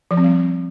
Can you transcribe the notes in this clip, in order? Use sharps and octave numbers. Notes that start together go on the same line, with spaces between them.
F3
C4
G3